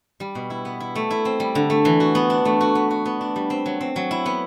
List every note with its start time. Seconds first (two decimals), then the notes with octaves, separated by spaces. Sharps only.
0.20 G3
0.35 B2
0.50 E4
0.65 B3
0.80 E4
0.96 A3
1.10 E4
1.25 C4
1.40 G3
1.55 D3
1.70 A3
1.85 E3
2.00 F#4
2.15 B3
2.30 D4
2.45 A3
2.61 F#4
2.75 B3
2.91 F#4
3.05 B3
3.21 D4
3.36 G3
3.50 C4
3.66 F#3
3.81 C4
3.96 F#3
4.11 E4
4.26 B3